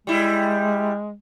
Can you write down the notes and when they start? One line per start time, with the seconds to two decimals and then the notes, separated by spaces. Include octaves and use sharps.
0.07 G3 G#3 E4